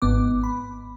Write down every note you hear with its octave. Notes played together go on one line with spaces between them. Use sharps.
G#1 G#2 B3 D6
B5